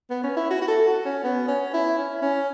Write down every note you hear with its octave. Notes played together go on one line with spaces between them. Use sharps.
B3
C#4
E4
F#4
F#4
A4
F#4
C#4
B3
C#4
E4
C#4
C#4